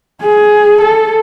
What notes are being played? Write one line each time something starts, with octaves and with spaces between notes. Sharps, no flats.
G#4
A4